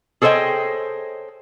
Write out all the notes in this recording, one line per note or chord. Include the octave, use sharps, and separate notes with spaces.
G#4 A4 C5 C#5 D#5 G5